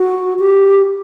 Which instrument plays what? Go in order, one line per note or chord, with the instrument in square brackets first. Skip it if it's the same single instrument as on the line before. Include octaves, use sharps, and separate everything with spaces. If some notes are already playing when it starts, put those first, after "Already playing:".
Already playing: [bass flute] F#4
G4